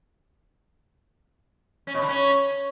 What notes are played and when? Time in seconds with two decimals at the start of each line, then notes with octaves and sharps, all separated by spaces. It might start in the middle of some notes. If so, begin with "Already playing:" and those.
1.87 C#4
1.94 B2
2.02 D3
2.09 C#4